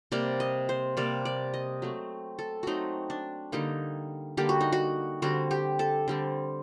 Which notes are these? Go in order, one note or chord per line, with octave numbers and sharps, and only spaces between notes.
C3 G3 A#3 D5
D#5
C5
C3 G3 A#3 D5
D5
D#5
F#3 A3 C4
A4
F#3 A3 C4 D#4 F#4
D4
D3 G3 A#3 D#4
D3 G3 A#3 G4
F#4
D#4
F#4
D3 G3 C4 F#4
G4
A4
D3 G3 C4